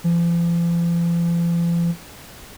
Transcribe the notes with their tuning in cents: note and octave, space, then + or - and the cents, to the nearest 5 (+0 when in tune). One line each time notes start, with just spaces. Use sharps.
F3 -45